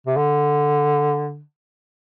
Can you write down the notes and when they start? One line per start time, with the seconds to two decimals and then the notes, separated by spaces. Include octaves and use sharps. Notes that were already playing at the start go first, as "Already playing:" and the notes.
0.07 C3
0.17 D3